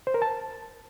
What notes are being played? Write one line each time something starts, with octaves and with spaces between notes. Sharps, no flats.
C5
A#4
A5